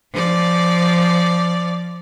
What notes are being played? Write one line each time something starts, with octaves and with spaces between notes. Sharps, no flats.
F3 D5